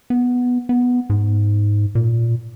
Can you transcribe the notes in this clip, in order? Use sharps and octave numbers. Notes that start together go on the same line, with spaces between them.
B3
B3
G#2
A#2